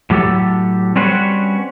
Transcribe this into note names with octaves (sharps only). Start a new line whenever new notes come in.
A2 F#3 G4 A4
G3 C4 C#4 F#4 B4 C5